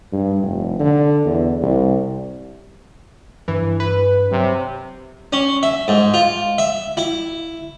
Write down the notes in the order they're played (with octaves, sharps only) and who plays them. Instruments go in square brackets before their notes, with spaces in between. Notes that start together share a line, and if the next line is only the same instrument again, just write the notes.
[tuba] G2
F1
D3
E2
C2
[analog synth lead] G2 [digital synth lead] E3
[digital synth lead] B4
[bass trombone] C3 [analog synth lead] F#3
[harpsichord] C#4
E5
G#2
F4
E5
E4